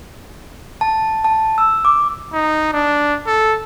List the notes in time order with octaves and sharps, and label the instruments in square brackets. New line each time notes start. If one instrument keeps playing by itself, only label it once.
[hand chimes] A5
A5
E6
D6
[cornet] D#4
D4
A4